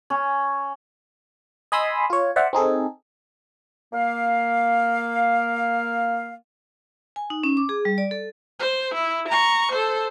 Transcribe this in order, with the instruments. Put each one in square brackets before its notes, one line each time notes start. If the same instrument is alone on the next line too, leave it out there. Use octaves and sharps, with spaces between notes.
[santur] C#4
[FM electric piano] D#5 G#5 B5 C6 D#6 E6
F4 C#5
C5 D5 E5 F#5
C4 D#4 G#4 A4
[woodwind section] A#3 F5
[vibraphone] G#5
D#4
C#4
D6
G#4
G3
D5
A4
[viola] C5
E4
A#5 C#6
A4 C5